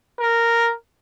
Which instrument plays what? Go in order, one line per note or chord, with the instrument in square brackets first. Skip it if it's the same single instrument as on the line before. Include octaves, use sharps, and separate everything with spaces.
[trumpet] A#4